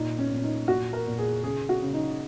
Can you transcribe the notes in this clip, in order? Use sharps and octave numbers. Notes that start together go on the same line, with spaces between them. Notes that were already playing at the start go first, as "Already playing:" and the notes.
Already playing: A#2 D#4
C#4
A#2
C#4
D#4
A#2 F#4
A#4
A#2
G#4
C#3 G#4
F#4
C#3
D#4